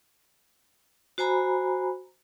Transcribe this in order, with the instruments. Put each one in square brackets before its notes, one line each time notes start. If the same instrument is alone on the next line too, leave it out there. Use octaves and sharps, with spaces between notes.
[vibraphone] F#4 C5 G#5 A#5 B5